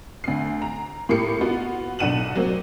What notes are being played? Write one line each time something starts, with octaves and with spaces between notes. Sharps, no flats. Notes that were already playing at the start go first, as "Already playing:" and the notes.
D2 C7
A#5
A2 A#3 G4 C7 C#7
B3 F4 F#4
B1 D4 F#5 D#7 E7 F#7
F#3 A#3 C4